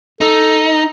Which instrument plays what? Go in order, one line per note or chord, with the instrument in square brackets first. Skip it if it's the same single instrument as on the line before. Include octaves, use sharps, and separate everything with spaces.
[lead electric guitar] D#4 [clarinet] A4